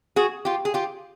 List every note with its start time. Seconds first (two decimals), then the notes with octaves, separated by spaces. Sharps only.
0.16 F#4 G#4
0.45 F4 G4
0.65 G#4
0.74 F4 G4